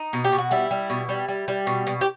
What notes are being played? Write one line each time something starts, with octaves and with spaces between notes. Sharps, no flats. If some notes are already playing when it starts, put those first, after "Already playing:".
Already playing: D#4
B2
G4
B2
F#4
G3 E4
G3
B2
G3
G3
G3
B2
B2
G4